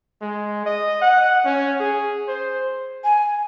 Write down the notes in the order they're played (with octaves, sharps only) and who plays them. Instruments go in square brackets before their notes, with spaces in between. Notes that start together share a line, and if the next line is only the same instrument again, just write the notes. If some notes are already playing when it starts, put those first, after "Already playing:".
[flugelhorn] G#3
D#5
F#5
C#4
G#4
C5
[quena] G#5